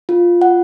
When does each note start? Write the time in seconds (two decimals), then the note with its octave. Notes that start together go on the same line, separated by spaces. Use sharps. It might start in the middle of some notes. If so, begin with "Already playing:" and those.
0.09 F4
0.42 F#5